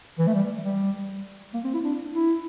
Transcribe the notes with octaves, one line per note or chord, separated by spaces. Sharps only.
E3
A3
G3
G3
A#3
C4
E4
D4
E4